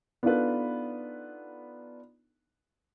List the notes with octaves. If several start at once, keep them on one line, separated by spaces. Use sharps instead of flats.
B3 D4 D#4 F4 A4 B4